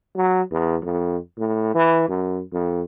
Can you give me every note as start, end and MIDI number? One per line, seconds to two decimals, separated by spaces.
0.15 0.42 54
0.51 0.77 40
0.82 1.17 41
1.38 1.75 45
1.75 2.05 52
2.09 2.42 42
2.53 2.82 41